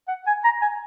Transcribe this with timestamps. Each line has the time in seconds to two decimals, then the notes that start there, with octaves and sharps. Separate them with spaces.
0.08 F#5
0.27 G#5
0.44 A#5
0.62 G#5